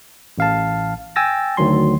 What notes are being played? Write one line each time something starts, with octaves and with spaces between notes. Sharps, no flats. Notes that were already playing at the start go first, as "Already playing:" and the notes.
A1 F5 A5
G5 G#5 E6 A6 A#6
D2 D#3 F#3 C6